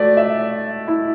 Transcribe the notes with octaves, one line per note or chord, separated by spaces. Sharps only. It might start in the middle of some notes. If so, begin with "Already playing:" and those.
Already playing: A3 F#4 D5
E5
E4